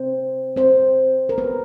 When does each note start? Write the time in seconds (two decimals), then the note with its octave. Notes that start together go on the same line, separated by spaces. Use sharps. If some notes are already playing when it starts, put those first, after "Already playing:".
Already playing: C4 C5
0.56 C4 C5
1.29 A#4
1.38 B3 B4